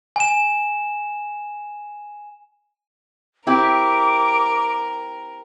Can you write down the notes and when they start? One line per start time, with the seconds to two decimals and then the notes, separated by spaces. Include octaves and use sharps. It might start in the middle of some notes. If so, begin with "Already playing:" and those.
0.16 G#5 E7
3.47 C4 E4 G4 A#4 D6